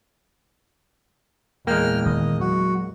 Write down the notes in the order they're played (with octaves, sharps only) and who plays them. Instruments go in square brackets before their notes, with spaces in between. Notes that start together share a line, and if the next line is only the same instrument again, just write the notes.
[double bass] E2 A#2 [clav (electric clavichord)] G#3 A#3 [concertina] G5 F6
[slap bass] D#1 D#3 C#4 [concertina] D#5
[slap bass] F#3 [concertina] F#4